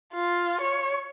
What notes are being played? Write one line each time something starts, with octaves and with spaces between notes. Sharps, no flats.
F4
C#5